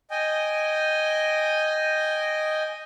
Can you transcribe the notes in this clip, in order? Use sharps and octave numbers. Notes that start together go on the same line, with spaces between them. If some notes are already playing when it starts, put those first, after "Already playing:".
D#5 G5 G#5